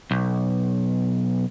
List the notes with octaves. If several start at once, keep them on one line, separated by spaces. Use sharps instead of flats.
B1